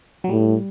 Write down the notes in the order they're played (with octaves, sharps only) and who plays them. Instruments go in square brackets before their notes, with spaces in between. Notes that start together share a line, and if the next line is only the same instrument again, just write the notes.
[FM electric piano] F#3
[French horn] A2 [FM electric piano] G3